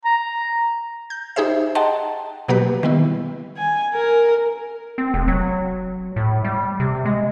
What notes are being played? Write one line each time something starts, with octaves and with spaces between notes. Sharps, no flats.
A#5
G6
D#4 G4 G#4 C5 E5
D#5 F#5 G5 A5 A#5 C6
B2 F#3 A#3 G4 B4
D#3 G3 B3 E4
G#5
A#4
C4
F1
F#3
A2
G3
C3
G#3